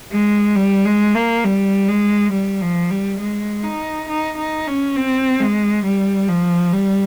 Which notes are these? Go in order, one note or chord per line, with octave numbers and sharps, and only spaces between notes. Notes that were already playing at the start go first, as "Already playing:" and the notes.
G#3
G3
G#3
A#3
G3
G#3
G3
F3
G3
G#3
D#4
D#4
D#4
C#4
C4
G#3
G3
F3
G3